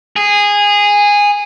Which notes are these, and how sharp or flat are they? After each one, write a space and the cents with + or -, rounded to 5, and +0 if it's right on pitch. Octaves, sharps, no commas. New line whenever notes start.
G#4 -15